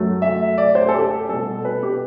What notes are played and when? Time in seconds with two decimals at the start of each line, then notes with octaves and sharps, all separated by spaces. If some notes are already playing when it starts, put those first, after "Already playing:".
Already playing: F#2 F#3 A3
0.22 E5
0.58 D5
0.75 C5
0.88 A4
0.94 G4
1.29 B2 G3 A4
1.65 B4
1.83 G4